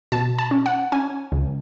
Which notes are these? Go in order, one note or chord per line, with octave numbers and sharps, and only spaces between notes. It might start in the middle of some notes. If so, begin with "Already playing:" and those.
B2 A5
A5
C#4
F#5
C#4 G#5
C#2